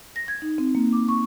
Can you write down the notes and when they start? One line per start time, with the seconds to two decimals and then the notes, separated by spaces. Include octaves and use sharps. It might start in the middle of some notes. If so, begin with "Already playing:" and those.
0.16 A#6
0.28 G#6
0.42 D#4
0.58 C4
0.75 A#3
0.93 D6
1.08 C#6